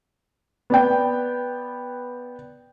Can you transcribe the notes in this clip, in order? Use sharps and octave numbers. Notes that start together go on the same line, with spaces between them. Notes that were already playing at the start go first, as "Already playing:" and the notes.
B3 D5 G5